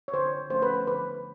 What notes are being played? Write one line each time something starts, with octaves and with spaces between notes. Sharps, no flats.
C#5
D3 C5
F3 A3 C#4 C5
B4
C5
D3 B4